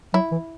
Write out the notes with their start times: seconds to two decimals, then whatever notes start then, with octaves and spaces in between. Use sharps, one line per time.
0.14 F#3 E4
0.31 E3